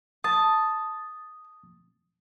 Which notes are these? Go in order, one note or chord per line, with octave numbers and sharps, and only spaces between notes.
A5 D#6